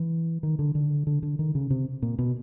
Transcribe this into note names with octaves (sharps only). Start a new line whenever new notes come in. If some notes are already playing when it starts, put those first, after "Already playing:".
Already playing: E3
D#3
D3
D3
D3
D3
D#3
C#3
C3
A#2
B2